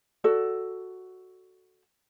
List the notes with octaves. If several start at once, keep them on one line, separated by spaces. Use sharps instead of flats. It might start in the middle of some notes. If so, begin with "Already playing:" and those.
F#4 A4 D5